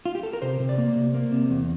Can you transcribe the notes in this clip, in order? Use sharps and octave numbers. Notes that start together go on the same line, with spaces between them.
F4
G4
A4
A#4
C3 C5
C3
D5
A#3
C3
A#3
C3
E2